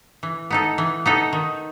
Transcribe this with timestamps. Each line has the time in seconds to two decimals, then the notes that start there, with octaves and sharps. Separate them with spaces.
0.23 E3
0.50 B3 D#4 A4
0.78 E3
1.06 B3 D#4 A4
1.33 D#3